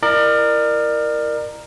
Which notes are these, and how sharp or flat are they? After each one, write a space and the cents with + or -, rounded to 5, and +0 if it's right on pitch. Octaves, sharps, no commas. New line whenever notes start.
E4 +15 A#4 +0 D5 +35